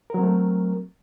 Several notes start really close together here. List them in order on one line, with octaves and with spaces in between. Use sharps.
A#4 F#3 C4 A3